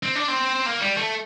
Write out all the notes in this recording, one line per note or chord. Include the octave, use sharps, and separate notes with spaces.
C4
D4
C4
A#3
G3
A3